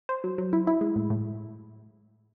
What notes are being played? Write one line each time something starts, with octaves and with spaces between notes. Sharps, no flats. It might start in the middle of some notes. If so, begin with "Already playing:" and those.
C5
F#3
F#3
E4
E4
G#3
A2
A2